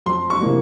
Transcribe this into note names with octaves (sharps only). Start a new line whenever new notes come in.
F2 C6
C#6
C3 E3 A#3